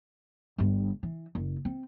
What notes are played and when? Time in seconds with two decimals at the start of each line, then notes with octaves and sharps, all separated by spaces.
0.58 G1 G2
1.03 E3
1.35 F#1
1.65 C4